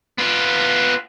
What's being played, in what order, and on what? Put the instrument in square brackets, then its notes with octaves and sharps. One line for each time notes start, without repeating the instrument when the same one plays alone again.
[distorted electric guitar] B3 F4